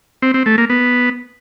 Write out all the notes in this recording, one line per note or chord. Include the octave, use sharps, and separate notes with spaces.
C4
C4
A3
A#3
B3